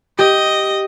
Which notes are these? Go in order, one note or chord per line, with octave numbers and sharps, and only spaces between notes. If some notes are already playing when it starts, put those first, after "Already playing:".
G4 D#5